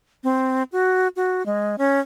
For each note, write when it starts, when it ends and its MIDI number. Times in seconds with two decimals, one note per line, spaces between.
0.24 0.63 60
0.72 1.08 66
1.16 1.45 66
1.46 1.76 56
1.78 2.00 61